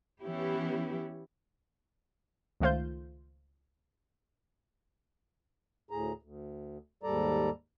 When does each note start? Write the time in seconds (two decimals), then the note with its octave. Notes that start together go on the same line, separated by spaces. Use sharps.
0.22 E3 B3 C#4 E4 G4
2.61 C#2 D#3 A3 F4 C5 G6
5.91 D2 A2 G#4 A#5
6.22 D2
7.03 D#2 G#2 G3 A4 D5 A#5